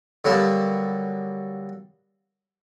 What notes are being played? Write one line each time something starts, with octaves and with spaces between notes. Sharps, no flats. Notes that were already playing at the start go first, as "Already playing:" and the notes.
D3 F#3 G3 A#3 B3 A5